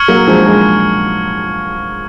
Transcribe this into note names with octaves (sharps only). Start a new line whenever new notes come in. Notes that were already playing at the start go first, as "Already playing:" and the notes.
Already playing: C#6 F6 G#6 C#7 F#7
F#3 A#3
F3 G#3
F3 G#3